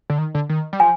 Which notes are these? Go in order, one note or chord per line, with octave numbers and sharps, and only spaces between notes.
D3
D#3
D3
D#3
G3
F3 G#5